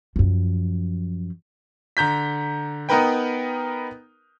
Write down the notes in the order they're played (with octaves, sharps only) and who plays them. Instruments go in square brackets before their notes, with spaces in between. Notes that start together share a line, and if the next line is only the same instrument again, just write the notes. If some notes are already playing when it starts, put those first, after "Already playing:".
[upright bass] F#2 F3
[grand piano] D3 A#5 G6 B6
B3 D#4 A#4 B4 G5